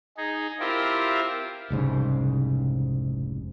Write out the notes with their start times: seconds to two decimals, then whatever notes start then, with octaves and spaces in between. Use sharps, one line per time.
0.17 D#4 G#4
0.60 C4 E4 F4 G4 A#4
1.70 F1 C2 G#2 C#3